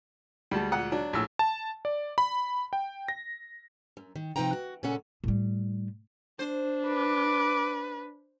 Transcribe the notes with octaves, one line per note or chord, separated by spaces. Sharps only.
D2 G3 G#3 A5
A#2 F#5
F#3 D4
A#1 A2 E6
A5
D5
B5
G5
A#6
F#2
D#3
C3 F3 D#4 B4 G5 A#5
F#4
A#2 C#3 G#3 C#4 A4 F#5
A2 G3
D4 C5
B4 D6